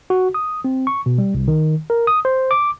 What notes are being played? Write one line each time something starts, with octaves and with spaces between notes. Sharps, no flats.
F#4
D#6
C4
C#6
B2
G3
C2
D#3
A#4
D#6
C5
D6